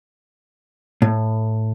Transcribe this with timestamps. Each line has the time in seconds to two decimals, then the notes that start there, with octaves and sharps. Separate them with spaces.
1.02 A2